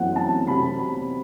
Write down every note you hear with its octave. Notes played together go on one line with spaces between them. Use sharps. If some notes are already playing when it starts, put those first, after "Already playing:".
Already playing: F#2 E3 A3 C4 F#5
A5
C3 F#3 C4 B5
B5